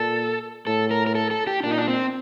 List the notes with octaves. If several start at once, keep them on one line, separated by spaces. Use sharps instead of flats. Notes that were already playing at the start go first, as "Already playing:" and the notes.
Already playing: A#2 A4
A2 A4
A#4
A#4
A4
A4
G4
A#2 D4
D#4
D4
C4